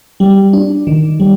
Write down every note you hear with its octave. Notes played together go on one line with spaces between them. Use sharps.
G3
D4
D#3
G3